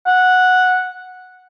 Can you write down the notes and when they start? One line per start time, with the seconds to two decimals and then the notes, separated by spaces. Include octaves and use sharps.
0.07 F#5